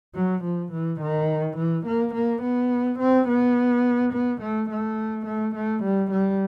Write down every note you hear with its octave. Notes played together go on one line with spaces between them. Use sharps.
F#3
F3
E3
D#3
E3
A#3
A#3
B3
C4
B3
B3
A3
A3
A3
A3
G3
G3